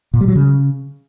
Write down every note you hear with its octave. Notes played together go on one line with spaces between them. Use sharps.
A#2
G3
F#3
C#3